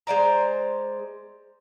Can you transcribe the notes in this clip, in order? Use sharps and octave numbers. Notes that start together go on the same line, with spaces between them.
G#3 C5 D5 A#5